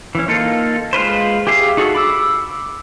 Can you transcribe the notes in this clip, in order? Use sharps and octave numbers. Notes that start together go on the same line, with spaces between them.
E3 C#4
A#3 D#4 F4 A4
G#3 F4 B4 C5
G4 G#4 E5 F5
D#4 F#4 G#4 A4
B5 D6 E6